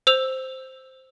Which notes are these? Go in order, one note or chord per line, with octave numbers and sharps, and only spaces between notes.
C5 E6 F7